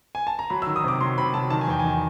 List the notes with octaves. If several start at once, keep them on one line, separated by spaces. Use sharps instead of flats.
G#5
A5
A#5
F#3 B5
E6
D#3
D#6
C3 D6
F#3 C6
C3 B5
F#3 A5
D#3 A5
G#5
E2 G5
G#5
D#3